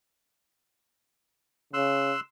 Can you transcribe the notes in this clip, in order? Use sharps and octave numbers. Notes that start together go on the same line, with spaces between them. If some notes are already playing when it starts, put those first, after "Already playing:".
C#3 C6 E6 F#6